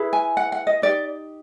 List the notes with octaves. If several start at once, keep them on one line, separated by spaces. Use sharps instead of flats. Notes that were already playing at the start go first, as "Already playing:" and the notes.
Already playing: E4 G#4 B4
G#5
F#5
F#5
D#5
D#4 G4 D5